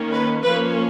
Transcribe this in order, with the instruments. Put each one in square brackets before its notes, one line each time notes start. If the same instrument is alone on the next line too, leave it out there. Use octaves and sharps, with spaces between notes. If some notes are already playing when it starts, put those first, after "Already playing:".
Already playing: [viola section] D#3 A#3 C#4
B4
F3 A#3 C#4 B4